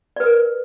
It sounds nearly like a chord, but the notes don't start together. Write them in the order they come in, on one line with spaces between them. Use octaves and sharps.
D5 B4 A#4